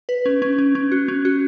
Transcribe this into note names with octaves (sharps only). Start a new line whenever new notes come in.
B4
C#4
C#4
C#4
C#4
F#4
C#4
F#4